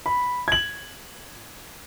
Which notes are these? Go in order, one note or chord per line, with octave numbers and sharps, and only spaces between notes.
B5
G#6 F#7